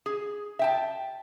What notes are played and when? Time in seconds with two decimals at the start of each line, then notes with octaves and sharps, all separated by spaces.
0.06 G#4
0.59 E5 G5 A5